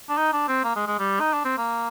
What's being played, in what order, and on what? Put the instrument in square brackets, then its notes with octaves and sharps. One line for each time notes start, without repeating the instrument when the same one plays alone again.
[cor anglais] D4
D#4
D4
C4
A#3
G#3
G#3
G3
D#4
D4
C4
A#3